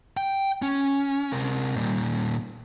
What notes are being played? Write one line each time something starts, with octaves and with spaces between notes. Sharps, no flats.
G5
C#4
C3 A#4
A#2 G3